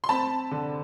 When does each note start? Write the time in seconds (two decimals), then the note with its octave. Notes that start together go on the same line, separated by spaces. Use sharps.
0.04 C6
0.09 C4 A5 B5
0.51 D3